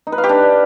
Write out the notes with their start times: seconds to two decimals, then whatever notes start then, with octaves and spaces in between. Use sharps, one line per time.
0.07 D#4
0.12 B4
0.18 F5
0.24 G4
0.29 D4